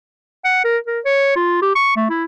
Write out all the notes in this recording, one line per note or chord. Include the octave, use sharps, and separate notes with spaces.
F#5
A#4
A#4
C#5
F4
G4
C#6
A3
E4